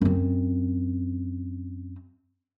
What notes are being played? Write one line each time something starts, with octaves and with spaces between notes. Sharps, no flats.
F#2 C4